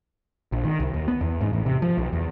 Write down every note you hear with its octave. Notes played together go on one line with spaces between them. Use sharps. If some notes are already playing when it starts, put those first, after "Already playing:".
A#1
D#3
C2
D#2
B3
E2
G#2
A1
C3
F3
B1
E2